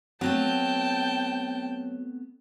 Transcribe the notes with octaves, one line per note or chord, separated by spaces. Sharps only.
F#3 A3 B3 C4 G5 A5 G6